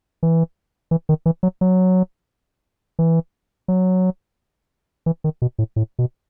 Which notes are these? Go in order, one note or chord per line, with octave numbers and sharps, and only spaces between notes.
E3
E3
D#3
E3
F#3
F#3
E3
F#3
E3
D#3
B2
A2
A2
B2